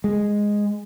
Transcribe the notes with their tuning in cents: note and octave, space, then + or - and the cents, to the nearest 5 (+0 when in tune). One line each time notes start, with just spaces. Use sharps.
G#3 -5